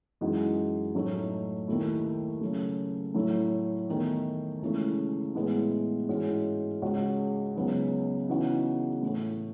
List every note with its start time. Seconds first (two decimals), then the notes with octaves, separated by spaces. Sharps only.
0.21 F#2 E3 G#3 D#4 F#4
0.95 A2 F#3 A3 D#4
1.68 D#2 D#3 A3 E4
2.41 C#3 F#3 A3
3.14 A2 F#3 A3 E4
3.88 E2 D#3 A3
4.62 C#2 C#3 E3 A3
5.35 A2 E3 G#3 B3
6.09 G#2 E3 G#3 C#4 F#4
6.82 C#2 C#3 G#3 C#4 F#4
7.56 C#2 C#3 F#3 B3 D#4
8.29 C#3 E3 B3 D#4 F#4
9.03 A2 E3 A3